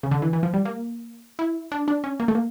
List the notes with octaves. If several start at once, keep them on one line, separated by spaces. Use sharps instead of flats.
C#3
D3
E3
E3
F3
G3
A#3
E4
D4
D4
C#4
A#3
A3
A#3